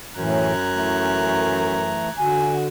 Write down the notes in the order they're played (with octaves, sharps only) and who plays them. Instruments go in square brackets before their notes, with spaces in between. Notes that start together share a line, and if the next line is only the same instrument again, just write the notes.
[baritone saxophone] F#2 [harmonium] A2 E3 [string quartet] A#5 F#6 G#6
[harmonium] E3 A3
[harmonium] D3 [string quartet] F#4 [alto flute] G#5